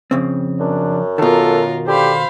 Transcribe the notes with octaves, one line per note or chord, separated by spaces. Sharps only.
F2 C#3 C4
F#2 D4
B2 D#3 F4 A4 A#4
D3 G4 C5 F5 B5